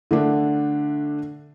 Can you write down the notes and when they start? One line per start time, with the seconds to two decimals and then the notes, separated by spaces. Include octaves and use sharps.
0.11 D3 A3 D4